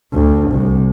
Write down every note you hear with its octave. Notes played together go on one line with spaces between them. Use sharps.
D2
C2